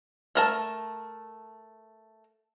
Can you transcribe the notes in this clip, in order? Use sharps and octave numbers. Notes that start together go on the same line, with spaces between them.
A3 A#4 A5